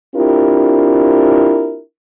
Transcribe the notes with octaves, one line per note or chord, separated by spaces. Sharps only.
C4 D4 E4 F4 G4 A#4